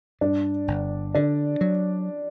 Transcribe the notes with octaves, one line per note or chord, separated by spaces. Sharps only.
G2 D4
G1
D3 D4
F#3